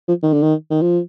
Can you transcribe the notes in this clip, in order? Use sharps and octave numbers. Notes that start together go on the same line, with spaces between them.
F3
D#3
D3
D#3
D#3
F3